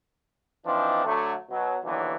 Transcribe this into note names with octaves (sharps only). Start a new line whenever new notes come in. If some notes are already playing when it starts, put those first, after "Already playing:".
E3 F3 C4 D4 D#4
D3 F#3 A3
B2 F#3
D#2 B2 D3 E3 F#3